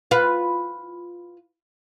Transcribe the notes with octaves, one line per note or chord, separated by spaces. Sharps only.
F4 B4